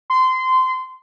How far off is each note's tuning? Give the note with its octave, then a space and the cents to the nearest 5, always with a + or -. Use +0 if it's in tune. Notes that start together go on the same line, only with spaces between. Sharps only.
C6 -20